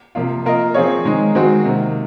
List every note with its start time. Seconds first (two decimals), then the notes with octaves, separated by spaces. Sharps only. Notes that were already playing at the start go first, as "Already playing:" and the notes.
0.15 C3 F3 A#3 F4
0.45 A#3 F4 A#4 D#5
0.74 F3 C4 F4 G#4 C#5
1.05 D#3 G#3 D#4
1.35 D#3 G#3 C4 F#4
1.64 C3 D#3 A#3